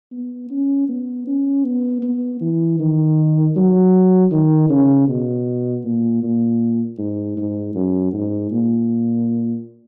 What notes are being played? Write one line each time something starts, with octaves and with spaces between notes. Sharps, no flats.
B3
C#4
B3
C#4
B3
B3
E3
D#3
F#3
D#3
C#3
B2
A#2
A#2
G#2
G#2
F#2
G#2
A#2